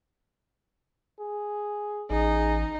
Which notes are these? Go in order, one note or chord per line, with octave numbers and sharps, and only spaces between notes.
G#4
A1 D#4 G#4